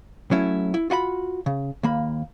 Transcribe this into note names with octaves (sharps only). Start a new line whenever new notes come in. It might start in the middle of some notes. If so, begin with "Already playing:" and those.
F#3 A3 C#4 E4
E4
F4 F#4 D#5 B5
C#3
D#2 A#3 B5